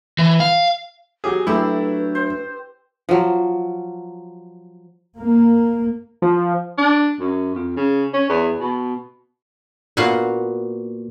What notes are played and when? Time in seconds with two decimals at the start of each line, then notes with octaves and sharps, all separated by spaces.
0.18 E3
0.40 F5
1.24 F#3 G4 G#4
1.47 F#3 A3 D4 E4 G4 B4 E6
2.15 C5
3.09 F3 F#3
5.18 A#3
6.22 F3
6.78 D4
7.20 F#2
7.55 F2
7.77 C#3
8.14 C#4
8.29 E2
8.60 B2
9.97 A#2 B3 F#4 F5